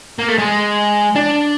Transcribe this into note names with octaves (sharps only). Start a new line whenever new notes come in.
A#3
A3
G#3
D4